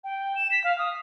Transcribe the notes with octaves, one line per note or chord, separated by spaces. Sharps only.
G5
E7
B6
F5
D#6